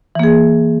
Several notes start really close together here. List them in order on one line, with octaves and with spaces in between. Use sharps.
E3 A#3 G#4